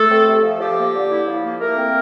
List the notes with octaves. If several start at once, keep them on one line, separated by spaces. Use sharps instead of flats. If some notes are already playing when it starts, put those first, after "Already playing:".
Already playing: A3 A4
C4
C3
F3
F3 G4
A#3
D3
E4
F3
A#3
A3 A#3 A#4
C4